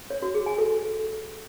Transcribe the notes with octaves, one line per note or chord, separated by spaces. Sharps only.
C#5
F#4
G#4
G#5
A4